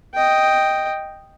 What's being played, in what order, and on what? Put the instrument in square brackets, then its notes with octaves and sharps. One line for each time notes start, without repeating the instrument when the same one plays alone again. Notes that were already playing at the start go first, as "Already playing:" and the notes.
[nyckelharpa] D#5 G5